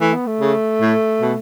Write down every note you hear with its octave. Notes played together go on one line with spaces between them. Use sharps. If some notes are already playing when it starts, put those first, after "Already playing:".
E3 A3
B3
A3
C#3
A2
B2